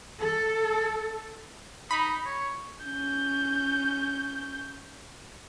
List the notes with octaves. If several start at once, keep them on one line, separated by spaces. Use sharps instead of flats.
A4
D#4 B5
C#5
C#4 G6